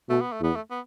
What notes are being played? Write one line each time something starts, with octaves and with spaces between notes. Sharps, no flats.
B2 A3
B3
A3
E2 B3
A3
B3